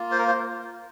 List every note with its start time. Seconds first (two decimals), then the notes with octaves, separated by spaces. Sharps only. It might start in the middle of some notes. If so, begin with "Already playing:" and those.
Already playing: A#3 F4
0.12 C5
0.19 A#4
0.28 C5